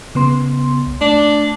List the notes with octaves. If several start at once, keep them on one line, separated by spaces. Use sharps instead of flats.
C#3 B3 C6
C2
A3 D4